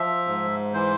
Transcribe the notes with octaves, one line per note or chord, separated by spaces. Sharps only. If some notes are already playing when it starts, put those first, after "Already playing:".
Already playing: F3 E5
G#2
E3 C5